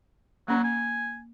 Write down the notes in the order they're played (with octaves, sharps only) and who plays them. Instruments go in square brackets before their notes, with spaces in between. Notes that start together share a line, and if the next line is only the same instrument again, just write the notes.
[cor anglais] F#3 [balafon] A#3 C#4
[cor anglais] G#5